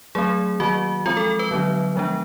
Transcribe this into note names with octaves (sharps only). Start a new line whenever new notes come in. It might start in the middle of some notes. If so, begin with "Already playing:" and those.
F#3 A3 C4 G#4
D#3 F#3 A#3 F#4
F3 G#3 C4 F4
A4
B4
D3 F#3 B3 D4
F3 G#3 B3 D4